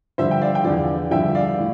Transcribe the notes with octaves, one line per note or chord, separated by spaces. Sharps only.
G2 D3 F3 C5 E5
G5
D5 F5
G5
E2 D3 F3 D5 F5
G2 D3 F3 E5 G5
D5 F5
A2